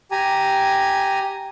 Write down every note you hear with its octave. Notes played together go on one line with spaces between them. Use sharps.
G4 G#5 A#5